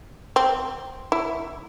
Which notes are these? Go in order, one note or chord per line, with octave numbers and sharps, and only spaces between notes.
C4
E4